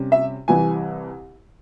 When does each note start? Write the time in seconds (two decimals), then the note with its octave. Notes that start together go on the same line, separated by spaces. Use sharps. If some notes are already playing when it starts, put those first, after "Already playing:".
Already playing: C3 G3 C#4
0.12 E5
0.48 C2 C3 E3 G#5